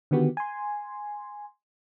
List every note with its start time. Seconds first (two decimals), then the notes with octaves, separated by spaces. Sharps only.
0.11 D3 D#3 B3 F#4 G4
0.37 G#5 C6